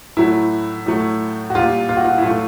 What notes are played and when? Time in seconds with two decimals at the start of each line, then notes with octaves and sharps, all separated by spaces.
0.17 A2 F#3 A3 E4
0.86 A2 F#3 A3
1.50 F#4
1.55 A#2 G3 F4
1.89 F4
1.97 F#4
2.05 F4
2.18 E4
2.22 A2 F#3 A3 F4